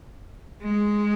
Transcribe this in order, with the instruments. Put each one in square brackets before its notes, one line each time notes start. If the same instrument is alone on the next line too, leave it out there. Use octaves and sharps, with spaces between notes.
[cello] G#3